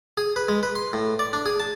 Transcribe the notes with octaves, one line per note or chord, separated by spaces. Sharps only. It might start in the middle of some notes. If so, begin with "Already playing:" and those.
G#4
B4
G#3
B4
C6
A2
D5
D4
G#4
A5